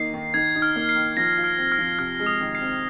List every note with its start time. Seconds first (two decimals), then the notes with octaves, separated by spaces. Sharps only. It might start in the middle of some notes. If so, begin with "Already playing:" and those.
Already playing: D#3 A#3 D#4 C7
0.14 D#3
0.34 D#3 G#6
0.55 D#4
0.62 F6
0.76 A#3
0.89 C7
0.96 D#3
1.17 F3 A#6
1.37 F4
1.44 F6
1.58 C4
1.72 F6
1.79 F3
1.99 C3 F6
2.20 G#3
2.26 D#6
2.41 D#3
2.55 C7
2.61 C4